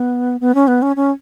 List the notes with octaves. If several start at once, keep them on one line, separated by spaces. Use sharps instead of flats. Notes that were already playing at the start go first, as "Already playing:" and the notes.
Already playing: B3
B3
C#4
B3
C#4
C#4